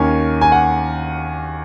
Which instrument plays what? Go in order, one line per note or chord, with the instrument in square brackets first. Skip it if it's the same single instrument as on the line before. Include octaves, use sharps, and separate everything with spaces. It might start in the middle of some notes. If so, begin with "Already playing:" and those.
Already playing: [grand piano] D#2 D#3 A#3 C#4 G#5
G#5
F#5